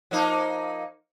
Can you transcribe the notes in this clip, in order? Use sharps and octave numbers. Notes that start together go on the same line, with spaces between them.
F3 A#3 D#4